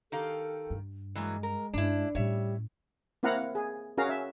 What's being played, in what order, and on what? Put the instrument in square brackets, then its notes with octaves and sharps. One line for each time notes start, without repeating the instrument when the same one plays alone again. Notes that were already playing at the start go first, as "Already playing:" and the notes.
[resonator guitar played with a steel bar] D#3 G4 F5 [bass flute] A4
[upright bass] G2
[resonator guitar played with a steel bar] E3 F#3 A#3 [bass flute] G#3
[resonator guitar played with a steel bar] A#4
[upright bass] G2 C#4 [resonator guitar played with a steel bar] D4 E4
[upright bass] A2 C#4 [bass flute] G3 [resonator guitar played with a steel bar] C#5 E5
[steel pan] A#3 C4 E4 F5 F#5 A#5
G#4
C#4 F#4 G#4 A#4 F5 A#5
E5